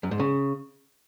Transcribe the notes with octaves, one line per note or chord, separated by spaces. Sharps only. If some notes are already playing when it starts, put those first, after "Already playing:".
F#2
G#2
C#3